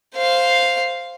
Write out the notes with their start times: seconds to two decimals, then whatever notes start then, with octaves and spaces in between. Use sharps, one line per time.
0.15 C5 F5